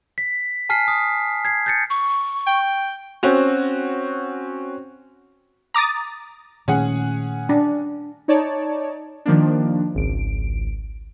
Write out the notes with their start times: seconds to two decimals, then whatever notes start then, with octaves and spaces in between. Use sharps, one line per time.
0.18 B6
0.69 G#5 A5 F6 B6 C7
0.88 D#6
1.45 G#6 C7
1.66 G6 A6 C#7
1.90 C#6
2.47 G5
3.23 C4 C#4 F#4
5.74 A#5 D6 D#6 A6
6.68 A#2 D#3 A3 C#4 G#4 F#5
7.49 D4
8.28 D#4 C#5 D5 A5
9.25 D#3 F3 A#3 D4
9.95 G#1 C#2 D7